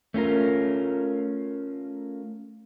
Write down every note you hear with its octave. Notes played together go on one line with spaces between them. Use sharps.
A3 C#4 F4 A#4